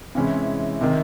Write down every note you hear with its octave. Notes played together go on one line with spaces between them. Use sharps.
C3 E3 G#3 C#4 E4
C3 D#3